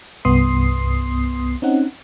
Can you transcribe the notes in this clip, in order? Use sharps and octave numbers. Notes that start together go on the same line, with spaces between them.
C2 G2 B3 C6 D#6 C7
C4 C#4 D#4 F#5